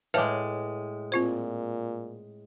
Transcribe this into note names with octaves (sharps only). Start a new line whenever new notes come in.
A2 G#3 B4 C#5 E5 F5 A5 D6
A#2 C4 F4 C5